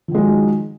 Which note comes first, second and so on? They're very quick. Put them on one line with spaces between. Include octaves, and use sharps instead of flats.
F3 D#3 G#3 F#3